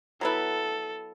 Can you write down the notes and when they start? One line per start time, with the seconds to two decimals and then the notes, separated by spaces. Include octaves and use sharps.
0.21 F#3 B3 E4 A4 B4